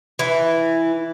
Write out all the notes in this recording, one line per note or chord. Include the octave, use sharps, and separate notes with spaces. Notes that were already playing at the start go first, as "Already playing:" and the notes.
E3